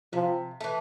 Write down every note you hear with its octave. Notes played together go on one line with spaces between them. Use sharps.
C3 F3
E3 A3